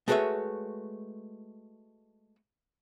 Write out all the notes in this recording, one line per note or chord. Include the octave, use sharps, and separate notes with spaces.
G#3 A3 F#4 B4 C#5 E5